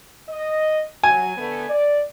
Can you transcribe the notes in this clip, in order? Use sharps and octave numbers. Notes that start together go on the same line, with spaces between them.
D#5
F#3 G#5
D3 A3 B3
D5